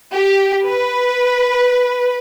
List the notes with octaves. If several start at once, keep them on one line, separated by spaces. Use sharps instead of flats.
G4
B4